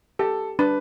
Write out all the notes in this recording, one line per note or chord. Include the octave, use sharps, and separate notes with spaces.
G4 A4
D4 B4